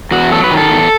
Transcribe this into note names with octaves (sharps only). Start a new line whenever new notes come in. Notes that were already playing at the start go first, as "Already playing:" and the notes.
E2 F#4
F#3 A4
B4
D#3
A4
E2